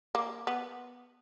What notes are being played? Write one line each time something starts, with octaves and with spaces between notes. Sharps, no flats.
A#3
B3